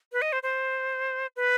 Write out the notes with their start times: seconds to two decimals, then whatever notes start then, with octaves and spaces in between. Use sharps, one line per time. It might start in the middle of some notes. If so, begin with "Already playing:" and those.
0.12 B4
0.22 D#5
0.32 C5
0.43 C5
1.36 B4